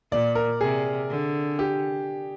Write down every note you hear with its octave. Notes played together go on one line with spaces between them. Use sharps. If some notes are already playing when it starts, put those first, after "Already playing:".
A#2 D5
A#4
C3 G#4
D3
G4